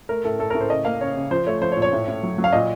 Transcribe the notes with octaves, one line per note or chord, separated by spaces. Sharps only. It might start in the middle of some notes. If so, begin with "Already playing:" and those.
A3 A#4
A2 A4
A3 A4
A2 A#4
C5
C#3 D#5
A#3 F5
C#3 C#5
C#3
F3 C5
A3 C#5
F3 C5
C#5
A#2
C#5
A2
A2
F#3
F#3
F5
A#2 D#5